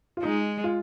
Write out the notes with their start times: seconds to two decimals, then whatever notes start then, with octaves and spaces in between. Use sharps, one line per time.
0.17 F4
0.23 G#3 D#4
0.64 F4